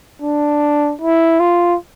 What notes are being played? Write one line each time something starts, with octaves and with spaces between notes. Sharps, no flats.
D4
E4
F4